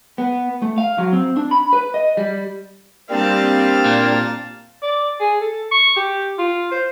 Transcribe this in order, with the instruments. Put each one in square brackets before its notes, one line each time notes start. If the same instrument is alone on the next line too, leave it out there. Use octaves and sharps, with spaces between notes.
[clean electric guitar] B3
A3
F5
F#3
C4
D4
B5
B4
D#5
G3
[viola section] G3 C4 [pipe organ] A#3 D4 G4 [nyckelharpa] F5 A5
[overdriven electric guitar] A#2
[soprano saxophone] D5
G#4
A4
C#6
G4
F4
C5